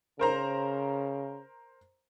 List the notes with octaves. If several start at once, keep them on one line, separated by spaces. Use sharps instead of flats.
C#3 A#4 C5 A#5